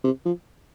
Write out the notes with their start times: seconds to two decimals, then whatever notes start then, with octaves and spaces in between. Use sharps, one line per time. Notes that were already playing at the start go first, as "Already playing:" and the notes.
0.04 C3
0.25 F3